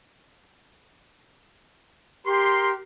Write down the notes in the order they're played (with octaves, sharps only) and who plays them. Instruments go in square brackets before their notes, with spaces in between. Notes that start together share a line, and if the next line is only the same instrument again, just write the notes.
[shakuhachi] G4 [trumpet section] A#4 C6